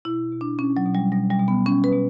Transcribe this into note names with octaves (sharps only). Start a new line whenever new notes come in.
B2 E4
B2
D4
B2 C#4
F#3
B2
G3
B2 G3
G3
B2
B3
B2 C#4
B4
B2